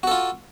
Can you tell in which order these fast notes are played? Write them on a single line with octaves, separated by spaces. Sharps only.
F#4 A4 F4